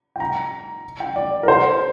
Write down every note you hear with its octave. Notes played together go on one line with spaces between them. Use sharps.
G5
A#5
G5
D5
A#4
C5